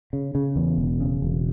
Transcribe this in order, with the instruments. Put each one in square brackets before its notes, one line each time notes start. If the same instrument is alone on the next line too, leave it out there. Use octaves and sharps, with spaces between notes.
[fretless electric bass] C#3
C#3
E2
E1
C#3
E1